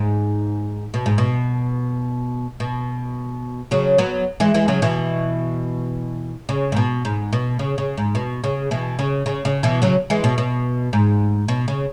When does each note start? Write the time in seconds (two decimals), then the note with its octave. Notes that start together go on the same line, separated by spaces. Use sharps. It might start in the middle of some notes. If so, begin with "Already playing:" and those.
Already playing: G#2
0.94 B2
1.06 G#2
1.18 B2
2.60 B2
3.71 C#3 F#3
3.98 F#3 B3
4.40 E3 G#3
4.54 E3 G#3
4.68 C#3 F#3
4.82 B2 E3
6.49 C#3
6.72 G#2
6.76 B2
7.05 G#2
7.33 B2
7.59 C#3
7.78 C#3
7.97 G#2
8.15 B2
8.44 C#3
8.71 B2 E3
8.99 C#3
9.26 C#3
9.45 C#3
9.63 B2 E3
9.82 C#3 F#3
10.10 E3 G#3
10.24 B2
10.38 B2
10.93 G#2
11.48 B2
11.68 C#3